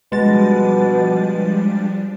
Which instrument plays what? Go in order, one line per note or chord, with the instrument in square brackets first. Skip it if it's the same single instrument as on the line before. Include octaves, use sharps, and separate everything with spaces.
[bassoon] B2 [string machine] F3 G3 D4 [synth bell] G#3 A6